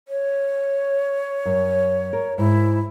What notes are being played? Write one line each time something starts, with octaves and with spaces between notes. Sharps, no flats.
C#5
F#2
A#4
G#2 E4